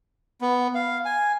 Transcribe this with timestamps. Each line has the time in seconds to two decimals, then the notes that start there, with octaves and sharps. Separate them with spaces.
0.41 B3
0.75 F5
1.05 G#5